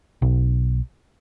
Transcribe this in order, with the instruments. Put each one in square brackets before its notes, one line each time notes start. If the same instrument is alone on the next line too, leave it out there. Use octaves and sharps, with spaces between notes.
[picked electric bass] B1